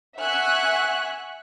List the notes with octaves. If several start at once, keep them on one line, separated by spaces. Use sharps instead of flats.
E5 F#5 G#5 C#6 F#6